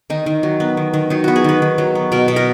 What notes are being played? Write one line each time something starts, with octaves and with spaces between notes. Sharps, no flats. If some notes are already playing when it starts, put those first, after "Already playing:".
D#3 D#4
D#3
F#3
B3
D#3
D#3
F#3 D#4
B3 F#4
G#4
D#3 B4
D#3
F#3
B3
B2 A#4
B2
A#4